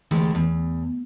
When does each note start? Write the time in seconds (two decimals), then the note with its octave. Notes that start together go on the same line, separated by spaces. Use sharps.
0.11 D2 E3 G#3 A3 G4
0.35 E2